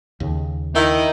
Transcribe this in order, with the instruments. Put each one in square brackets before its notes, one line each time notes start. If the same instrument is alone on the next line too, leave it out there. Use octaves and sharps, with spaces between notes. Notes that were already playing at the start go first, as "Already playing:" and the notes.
[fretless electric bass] D#2 C#3
[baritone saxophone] D#3 [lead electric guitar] D#4 [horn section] E4